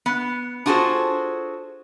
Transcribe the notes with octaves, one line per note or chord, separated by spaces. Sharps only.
B3
D4 F4 F#4 G#4 A4 C5